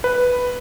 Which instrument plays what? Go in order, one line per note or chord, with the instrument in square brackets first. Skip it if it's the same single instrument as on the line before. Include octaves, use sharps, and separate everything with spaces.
[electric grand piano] B4